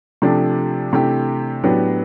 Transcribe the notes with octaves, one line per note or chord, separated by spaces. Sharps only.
C3 F3 A3 D4 G4
C3 E3 A3 D4 G4
A2 F#3 B3 D4 G4